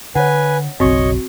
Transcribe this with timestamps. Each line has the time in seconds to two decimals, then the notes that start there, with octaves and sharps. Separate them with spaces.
0.15 D3 B4 C#5 F#5 G#5
0.80 F#1 B1 C4 F#4 C#5 D#5 C#6